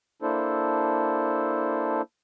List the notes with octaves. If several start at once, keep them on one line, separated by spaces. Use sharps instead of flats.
A#3 D4 E4 A4 C5